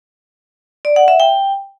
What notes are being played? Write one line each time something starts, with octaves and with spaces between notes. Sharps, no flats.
D5
F#5
E5
G5